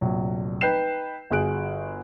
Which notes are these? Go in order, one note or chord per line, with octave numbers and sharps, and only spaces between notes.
F1 A#1 F#3
D#4 B4 G5 G6 C7 E7
G1 F#4 G#4 F#6 D7